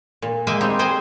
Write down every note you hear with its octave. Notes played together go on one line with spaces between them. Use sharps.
A#2
G#3 A#3 E5 G5 G#5
G3 C4 D#4
G#4 C5 D#5 G5 G#5